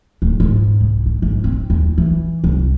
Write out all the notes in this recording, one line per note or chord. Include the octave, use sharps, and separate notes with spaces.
D1
G#2
C2
G#1
G#1
C4
D#2
E3
C2